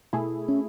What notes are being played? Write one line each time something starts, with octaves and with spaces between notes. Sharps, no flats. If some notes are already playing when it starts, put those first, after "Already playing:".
B2 A3 E4 G#4
C#4